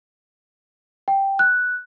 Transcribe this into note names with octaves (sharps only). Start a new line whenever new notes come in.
G5
F#6